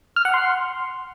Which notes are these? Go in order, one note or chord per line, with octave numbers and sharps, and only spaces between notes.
F6
F#5
C6